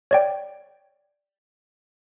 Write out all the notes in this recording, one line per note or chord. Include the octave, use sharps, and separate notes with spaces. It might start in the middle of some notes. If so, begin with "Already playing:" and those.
C#5 D5 G5